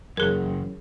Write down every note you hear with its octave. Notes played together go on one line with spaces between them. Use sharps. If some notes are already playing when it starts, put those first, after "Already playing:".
F#2 C#3 E3 F#3 C#4 G#4 A#4